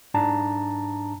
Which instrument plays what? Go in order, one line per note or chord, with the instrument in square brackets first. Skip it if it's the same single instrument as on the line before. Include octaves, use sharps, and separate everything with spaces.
[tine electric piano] G#2 D4 A5 A#5